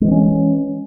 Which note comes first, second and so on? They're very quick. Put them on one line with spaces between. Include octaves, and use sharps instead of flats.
G#3 E3 C4 C#4